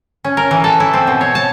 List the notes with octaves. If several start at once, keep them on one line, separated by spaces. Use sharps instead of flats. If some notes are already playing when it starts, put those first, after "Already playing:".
C#4
A#4
E3
A4
E4
C4
B2
C#5
A5